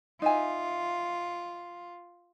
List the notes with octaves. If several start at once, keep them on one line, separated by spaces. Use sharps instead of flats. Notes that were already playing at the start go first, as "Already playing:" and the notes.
D#4 F4 E5 G#5